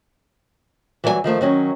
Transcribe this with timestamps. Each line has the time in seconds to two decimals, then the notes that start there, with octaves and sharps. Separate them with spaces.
1.04 E3 F#3 G3 D5 G#5
1.24 D#3 F3 A3
1.41 D#3 F#3 C#4